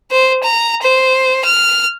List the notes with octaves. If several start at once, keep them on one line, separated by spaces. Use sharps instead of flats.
C5
A#5
C5
F6